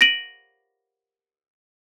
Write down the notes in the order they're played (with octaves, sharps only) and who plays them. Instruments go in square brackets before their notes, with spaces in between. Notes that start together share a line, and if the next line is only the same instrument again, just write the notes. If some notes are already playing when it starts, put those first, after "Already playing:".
[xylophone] A#6 D7 D#7 F#7